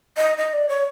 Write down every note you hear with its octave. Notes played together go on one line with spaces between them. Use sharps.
D#5
D#5
D5
C#5